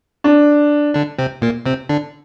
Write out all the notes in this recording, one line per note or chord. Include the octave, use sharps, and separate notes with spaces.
D4
D3 D4
C3 C4
A#2 A#3
C3 C4
D3 D4